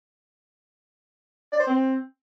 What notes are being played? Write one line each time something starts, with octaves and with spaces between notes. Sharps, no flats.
D5
C5
C4